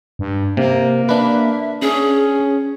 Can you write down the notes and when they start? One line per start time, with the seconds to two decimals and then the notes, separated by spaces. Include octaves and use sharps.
0.19 G2
0.57 C3 A#3
1.09 D4 B4 E5
1.82 C#4 G#4